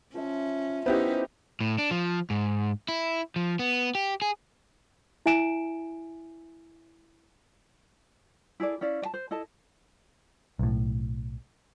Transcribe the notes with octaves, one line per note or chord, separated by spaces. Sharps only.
F3 C#4 C5 E5
B3 C#4 D#4 E4 G4 C5
A2
D4
F3
G#2
E4
F3
B3
G4
G#4
E4 E5 G#5 D7 E7
E4 G#4 A4 D5
C#4 E4 D5 F5
D5 A5
C5
E4 A4 D#5 A5
B1 A2